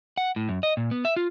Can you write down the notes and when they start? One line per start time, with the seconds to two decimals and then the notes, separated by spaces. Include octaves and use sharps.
0.18 F#5
0.36 A2
0.49 F#2
0.63 D#5
0.77 A#2
0.91 B3
1.05 E5
1.16 F4